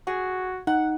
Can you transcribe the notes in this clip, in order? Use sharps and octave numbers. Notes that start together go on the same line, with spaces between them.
F#4 G#4
D#4 F#5